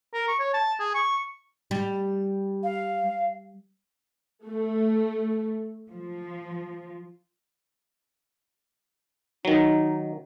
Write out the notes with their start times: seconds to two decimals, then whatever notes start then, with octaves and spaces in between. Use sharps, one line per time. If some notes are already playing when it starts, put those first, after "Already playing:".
0.14 A#4
0.28 C#6
0.40 C#5
0.54 A5
0.79 G#4
0.94 C#6
1.71 G3
2.63 F5
4.45 A3
5.90 F3
9.45 D#3 F#3 D#4